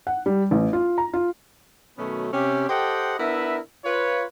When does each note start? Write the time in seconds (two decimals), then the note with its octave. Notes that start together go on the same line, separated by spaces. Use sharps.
0.07 F#5
0.26 G3
0.51 A1
0.73 F4
0.98 A#5
1.13 F4
1.98 B2 D#3 F#3 A3 B3 C#4
2.33 C3 C#4 G4
2.69 G4 A4 C5 D#5 F#5 G5
3.19 B3 D4 E4 A#4 B4 E5
3.85 F4 B4 C#5